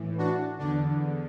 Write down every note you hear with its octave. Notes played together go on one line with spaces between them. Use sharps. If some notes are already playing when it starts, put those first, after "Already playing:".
Already playing: A2 E3
D4 F#4
E2 D3 D4